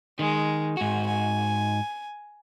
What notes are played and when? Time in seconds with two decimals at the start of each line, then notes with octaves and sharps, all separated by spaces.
0.19 D#3 G#3
0.77 G#2 F#4 G#5
1.06 G#5